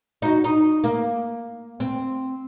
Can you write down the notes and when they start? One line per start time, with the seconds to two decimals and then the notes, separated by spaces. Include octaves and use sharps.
0.22 D#4 F#4
0.44 D#4
0.84 A#3
1.80 C4